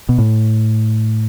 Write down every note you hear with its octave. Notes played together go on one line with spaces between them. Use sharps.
B2
A2